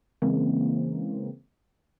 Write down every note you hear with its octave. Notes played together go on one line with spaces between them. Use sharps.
C#3 E3 G#3 A#3 C4